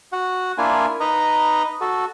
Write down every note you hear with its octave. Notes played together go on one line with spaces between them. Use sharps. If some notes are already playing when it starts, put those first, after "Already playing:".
F#4 F#5
A#3 D4 E4 F4 G#5
D#4 B4 D#5 A#5
F#4 A4